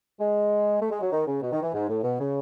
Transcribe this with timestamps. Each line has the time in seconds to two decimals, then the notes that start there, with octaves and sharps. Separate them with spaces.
0.20 G#3
0.81 A3
0.91 G#3
1.01 F#3
1.12 D#3
1.27 C#3
1.42 B2
1.52 D#3
1.63 E3
1.74 G#2
1.89 A2
2.04 B2
2.20 C#3